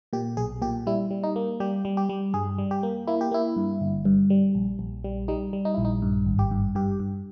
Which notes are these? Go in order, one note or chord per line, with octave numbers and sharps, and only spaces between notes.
A#2 G4
B1 G#4
A#2 G4
G3 E4
G3
D#4
A#3
G3 G4
G3
G4
G3
G2 G#4
G3
G4
A#3
A#3 E4
G4
A#3 E4
G2
G1
G2
G3
A#1
A#1
G3
G3 D#4
G3
D#4
A#1 E4
D#4
G2
G#1
G4
G2
G2 G4
G2